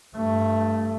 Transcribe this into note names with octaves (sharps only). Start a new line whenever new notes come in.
G2 A3